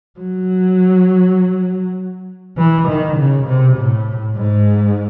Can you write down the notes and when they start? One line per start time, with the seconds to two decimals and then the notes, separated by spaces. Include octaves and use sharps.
0.19 F#3
2.57 E3
2.88 D#3
3.17 C#3
3.46 C3
3.77 A2
4.36 G#2